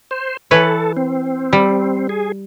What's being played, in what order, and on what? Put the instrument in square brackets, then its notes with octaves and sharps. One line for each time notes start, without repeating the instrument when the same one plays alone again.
[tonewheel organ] C5
[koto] E3 B4 C#5 [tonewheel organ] A4
[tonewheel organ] C4
[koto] G3
[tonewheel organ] G#4